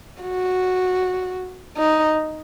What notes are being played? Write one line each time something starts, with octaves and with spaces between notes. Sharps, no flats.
F#4
D#4